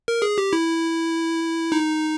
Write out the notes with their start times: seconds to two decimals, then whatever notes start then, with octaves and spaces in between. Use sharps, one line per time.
0.08 A#4
0.22 G#4
0.38 G4
0.53 E4
1.72 D#4